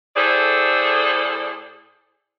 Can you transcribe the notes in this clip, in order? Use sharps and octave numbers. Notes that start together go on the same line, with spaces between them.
A2 G#4 A4 C5 D5